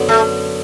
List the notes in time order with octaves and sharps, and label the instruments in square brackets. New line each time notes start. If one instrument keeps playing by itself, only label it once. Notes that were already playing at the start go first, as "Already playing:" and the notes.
Already playing: [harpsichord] F#2 D3 F#3 B3
[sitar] A3